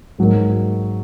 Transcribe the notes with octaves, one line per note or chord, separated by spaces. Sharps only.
G#2 F#3 A#3